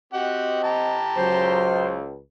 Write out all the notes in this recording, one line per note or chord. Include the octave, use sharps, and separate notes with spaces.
C4 F#4 G4 D#5 F#5
G4 A5 A#5
C#2 F#3 C5